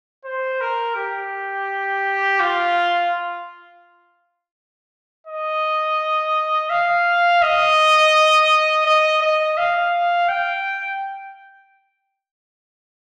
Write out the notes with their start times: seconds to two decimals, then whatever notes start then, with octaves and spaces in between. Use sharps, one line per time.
0.25 C5
0.61 A#4
0.96 G4
2.40 F4
5.27 D#5
6.70 F5
7.42 D#5
8.86 D#5
9.22 D#5
9.57 F5
10.29 G5